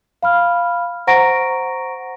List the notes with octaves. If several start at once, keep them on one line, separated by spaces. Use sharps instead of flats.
F5 B5 F6
C5 F#5 A#5 C#6 A#6 D7